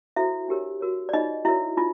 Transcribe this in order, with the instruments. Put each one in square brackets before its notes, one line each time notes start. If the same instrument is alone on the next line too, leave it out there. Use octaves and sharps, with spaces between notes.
[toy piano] E4 F#4 A4 C5 E5
D4 G4 A#4 C#5
F#4 A#4 C#5
D5
D#4 F4 G#4 C#5 D#5
E4 F#4 A#4 C#5 E5
D#4 F4